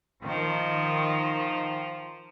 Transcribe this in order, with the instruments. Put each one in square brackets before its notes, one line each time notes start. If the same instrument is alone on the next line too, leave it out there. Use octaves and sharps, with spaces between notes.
[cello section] D#3 [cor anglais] F3